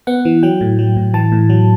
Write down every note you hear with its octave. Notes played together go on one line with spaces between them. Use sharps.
B3 F#5
E3
F#3 G5
A2
F#3
A2
E3 A5
A2
F#3